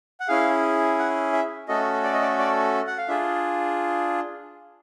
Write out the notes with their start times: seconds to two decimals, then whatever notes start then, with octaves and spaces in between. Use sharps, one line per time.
0.20 F#5
0.28 C#4 E4 G#4 F5
0.99 F#5
1.33 E5
1.68 A3 C#4 F#4 A4 D#5
2.04 D5
2.13 D#5
2.22 D5
2.39 D5
2.87 F#5
2.98 F5
3.08 D4 F4 G#4 E5